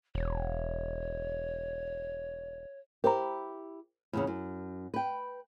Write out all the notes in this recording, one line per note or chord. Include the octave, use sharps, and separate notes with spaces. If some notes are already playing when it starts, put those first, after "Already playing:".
E1 C#5
E4 G4 A#4 C5 A#5
E2 A2 C#3
F#2
B4 G5